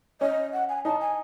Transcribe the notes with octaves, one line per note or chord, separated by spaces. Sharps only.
C#4 D#5
F#5
G#5
D#4 A5
G#5